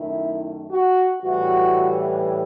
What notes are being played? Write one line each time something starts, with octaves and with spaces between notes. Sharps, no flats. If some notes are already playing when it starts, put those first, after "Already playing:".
Already playing: F#2 D#3 A3 E4
F#4
A2 E3 G3 F#4